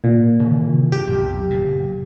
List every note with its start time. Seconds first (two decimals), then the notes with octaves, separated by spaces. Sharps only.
0.04 A#2
0.40 C3 D#3 E3
0.92 G2 G4
1.07 B1 F2
1.50 F#1 A#2